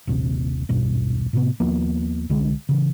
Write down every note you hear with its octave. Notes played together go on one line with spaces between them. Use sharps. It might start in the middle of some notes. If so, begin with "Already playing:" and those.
D#1 A#1 C3
D#1 B1 G2 B2
A2 C3 B3
D#2 F3 A#3 B3
C2 D3 G#3
C#3 E3